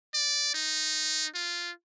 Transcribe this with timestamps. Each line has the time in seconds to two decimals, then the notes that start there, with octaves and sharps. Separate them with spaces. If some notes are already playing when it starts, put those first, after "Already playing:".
0.14 D5
0.54 D#4
1.35 F4